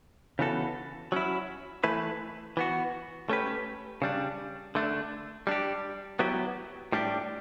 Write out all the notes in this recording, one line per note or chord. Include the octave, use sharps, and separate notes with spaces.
C#3 E3 B3 F#4 A4
F#3 C#4 E4
E3 A3 E4 B4
E3 B3 F#4
A3 C#4 G4 B4
C#3 G3 D4
D3 A3 D4
G3 D4 G4
F#3 B3 E4 G4
A2 G3 D4 G4